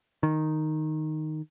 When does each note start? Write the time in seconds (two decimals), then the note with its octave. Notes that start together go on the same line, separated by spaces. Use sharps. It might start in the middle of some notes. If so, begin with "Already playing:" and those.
0.23 D#3